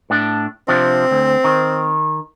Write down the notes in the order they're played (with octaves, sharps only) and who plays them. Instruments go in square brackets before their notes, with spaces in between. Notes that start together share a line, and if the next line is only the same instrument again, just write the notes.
[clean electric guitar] A2 D4
[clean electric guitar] C3 F3 D4 [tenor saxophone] C4
[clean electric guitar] D2
D#3